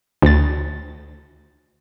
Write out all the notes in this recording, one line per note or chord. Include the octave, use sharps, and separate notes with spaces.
D2 A6